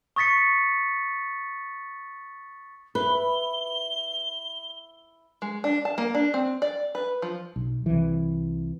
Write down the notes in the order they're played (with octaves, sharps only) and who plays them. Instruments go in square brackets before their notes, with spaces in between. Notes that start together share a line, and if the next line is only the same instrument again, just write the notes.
[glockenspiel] C#6 D#6 A6 B6 C#7
[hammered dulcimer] E4 [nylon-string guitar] B4 [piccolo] G7
[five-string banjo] G#3
D4
A5
A#3
D4
C4
D5
B4
F3
[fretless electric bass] B1
C2 E3